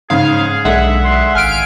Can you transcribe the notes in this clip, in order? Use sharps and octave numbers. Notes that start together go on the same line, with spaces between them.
G#2 C#3 G#4 F5
B1 D3 G#3 E5 F#5
C6
G#1 F5 G#5 F6 D7